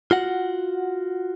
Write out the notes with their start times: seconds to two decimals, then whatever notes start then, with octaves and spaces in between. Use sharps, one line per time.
0.11 F4 F#4 F#5